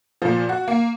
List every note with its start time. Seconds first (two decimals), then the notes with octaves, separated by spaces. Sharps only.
0.22 A#2 F3
0.49 F#4
0.68 A#3